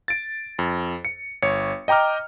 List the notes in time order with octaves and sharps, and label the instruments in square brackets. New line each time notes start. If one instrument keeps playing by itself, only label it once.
[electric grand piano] A6 D7
F2
C#7
G1 C#5 C#7
D#5 G5 A#5 D6 F6